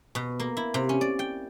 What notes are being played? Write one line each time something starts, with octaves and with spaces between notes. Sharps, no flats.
B2
A#3
E4
C3
C#4
D5
G5